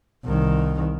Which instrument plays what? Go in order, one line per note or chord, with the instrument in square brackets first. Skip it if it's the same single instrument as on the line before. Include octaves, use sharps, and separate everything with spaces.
[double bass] C2 D#3